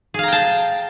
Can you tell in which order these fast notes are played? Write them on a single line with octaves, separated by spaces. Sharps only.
G#4 F5 A#5 G5 A5